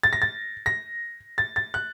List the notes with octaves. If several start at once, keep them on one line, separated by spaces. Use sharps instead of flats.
A6
A#6
A6
A#6
A6
A6
F#6